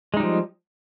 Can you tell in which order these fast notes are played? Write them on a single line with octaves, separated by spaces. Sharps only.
G#3 D#4 G3 F3